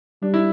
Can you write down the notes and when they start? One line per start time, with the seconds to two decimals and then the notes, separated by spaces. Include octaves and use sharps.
0.22 G3 D4
0.34 E4